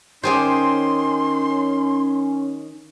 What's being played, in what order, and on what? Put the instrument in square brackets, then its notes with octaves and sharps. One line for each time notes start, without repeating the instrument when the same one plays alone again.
[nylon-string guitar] D#3 [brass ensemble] C#4 [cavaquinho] G4 G#4 C5 [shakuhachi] C6